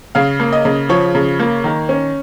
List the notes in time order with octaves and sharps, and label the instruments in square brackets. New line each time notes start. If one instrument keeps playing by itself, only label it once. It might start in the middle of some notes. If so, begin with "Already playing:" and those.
[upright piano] C#3 F5
A#3
D#5
C#3
F3 C#5
C#3
A#3
D#3
C#4